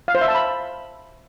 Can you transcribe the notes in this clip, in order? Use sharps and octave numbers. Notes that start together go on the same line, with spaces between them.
F5
C5
E5
A5
B5